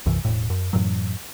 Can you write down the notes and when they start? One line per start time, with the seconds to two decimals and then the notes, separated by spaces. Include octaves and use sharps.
0.06 B1 F#2 C3 E3
0.25 E1 A2
0.50 F#2
0.73 F#2 A2 E3 F#3